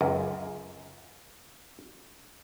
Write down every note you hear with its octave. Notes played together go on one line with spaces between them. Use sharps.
C#2 F#2